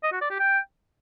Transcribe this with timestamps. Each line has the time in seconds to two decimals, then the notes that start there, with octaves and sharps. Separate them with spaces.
0.03 D#5
0.12 F#4
0.21 D5
0.30 G4
0.39 G5